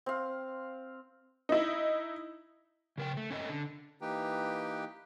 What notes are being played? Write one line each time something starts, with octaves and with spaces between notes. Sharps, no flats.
C4 F5
D#4 E4
C#3 A#4 G5
A3
C#4 A4 D#5
D3
E3 A#3 D#4 G4 B4 G5